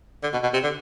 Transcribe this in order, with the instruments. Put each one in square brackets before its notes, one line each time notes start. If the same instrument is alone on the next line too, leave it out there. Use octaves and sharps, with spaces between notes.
[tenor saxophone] D3
B2
B2
C3
D3